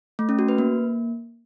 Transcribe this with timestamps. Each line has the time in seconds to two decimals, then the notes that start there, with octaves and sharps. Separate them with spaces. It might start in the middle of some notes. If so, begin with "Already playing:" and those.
0.19 A3
0.29 C#4
0.39 F#4
0.49 B4
0.58 A#3